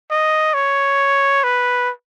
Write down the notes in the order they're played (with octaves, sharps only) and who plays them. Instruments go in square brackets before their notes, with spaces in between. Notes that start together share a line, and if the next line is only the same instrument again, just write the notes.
[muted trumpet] D#5
C#5
B4